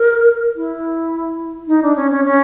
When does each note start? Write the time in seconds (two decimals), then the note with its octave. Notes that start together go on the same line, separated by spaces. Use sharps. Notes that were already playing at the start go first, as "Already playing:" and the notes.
Already playing: A#4
0.56 E4
1.68 D#4
1.82 D4
1.96 C#4
2.11 C#4
2.25 C#4